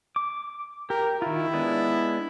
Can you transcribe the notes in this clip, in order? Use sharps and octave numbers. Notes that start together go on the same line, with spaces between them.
D6
G4 A#4
D#3 E4 F4
G#3 B3 D4